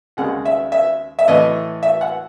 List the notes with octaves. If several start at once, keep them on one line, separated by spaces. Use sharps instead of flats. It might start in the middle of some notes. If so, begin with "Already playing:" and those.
D#2 C#3 G#3 F#5
E5
E5
E5
A2 E3 A3 D#5
E5
F#5